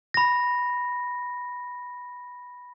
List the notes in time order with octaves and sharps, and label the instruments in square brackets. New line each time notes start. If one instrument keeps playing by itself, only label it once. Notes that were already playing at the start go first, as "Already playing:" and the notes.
[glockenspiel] B5 A#6